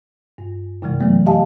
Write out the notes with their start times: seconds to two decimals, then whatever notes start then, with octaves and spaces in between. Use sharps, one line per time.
0.38 G2
0.82 F#2 C3 E3 G#3
1.00 E3 F#3 A3 B3
1.26 G4 D#5 F5 G#5 A5